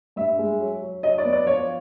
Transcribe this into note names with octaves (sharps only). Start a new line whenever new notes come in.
G2 E5
G#3
F#3
F#3
F#3 D#5
D5
B3
D5
F3 C#5